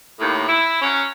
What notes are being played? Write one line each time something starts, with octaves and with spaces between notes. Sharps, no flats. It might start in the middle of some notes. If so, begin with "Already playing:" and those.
D#2 A2
E4
F#3 C#4